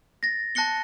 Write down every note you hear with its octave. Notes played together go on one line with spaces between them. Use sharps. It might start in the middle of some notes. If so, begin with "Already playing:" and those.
A6 A#6
A5 F#6 A#6 C#7 G7